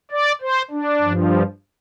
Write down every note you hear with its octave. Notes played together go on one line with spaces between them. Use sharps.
D5
C5
D4
G2 F3